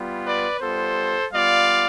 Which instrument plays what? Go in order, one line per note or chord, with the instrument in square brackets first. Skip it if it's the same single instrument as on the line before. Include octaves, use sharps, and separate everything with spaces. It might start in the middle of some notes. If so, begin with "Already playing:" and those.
Already playing: [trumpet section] G3 B3 F4
B4 D5
G3 B3 F4 A4 C5
G3 B3 F4 D5 F5